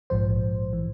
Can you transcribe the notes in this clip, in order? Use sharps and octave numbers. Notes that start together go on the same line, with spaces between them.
A#1 G#2 F3 C5
E3